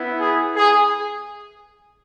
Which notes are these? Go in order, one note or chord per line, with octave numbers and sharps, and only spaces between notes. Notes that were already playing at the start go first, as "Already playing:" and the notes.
Already playing: B3 E4
G#4
G#4